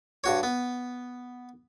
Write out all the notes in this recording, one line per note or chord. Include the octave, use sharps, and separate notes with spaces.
G2 F#4 C#5
B3